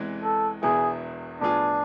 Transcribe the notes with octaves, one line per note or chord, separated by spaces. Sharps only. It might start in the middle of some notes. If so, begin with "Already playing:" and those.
Already playing: E2 C3 E3 G#3
A4
E1 E2 B2 B3 E4 G#4
A2 F3 B3 D4 F4 G#4